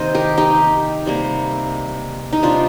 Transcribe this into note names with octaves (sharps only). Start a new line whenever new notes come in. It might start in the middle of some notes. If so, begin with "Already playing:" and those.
Already playing: C3 D#3 A#3 C5 D#5
G4 A#4
D#4 G4
C3 G3 A#3
D#4
C3 G3 A#3 D4 F4